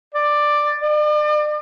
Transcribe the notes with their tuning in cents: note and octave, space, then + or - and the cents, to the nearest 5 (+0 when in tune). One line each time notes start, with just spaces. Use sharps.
D5 +10
D5 +40